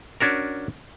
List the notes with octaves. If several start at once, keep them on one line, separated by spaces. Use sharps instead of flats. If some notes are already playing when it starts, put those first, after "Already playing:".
C#4 D4 F#4 A#4